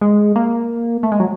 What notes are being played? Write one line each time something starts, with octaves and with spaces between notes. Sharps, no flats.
G#3
A#3
A3
G#3
F#3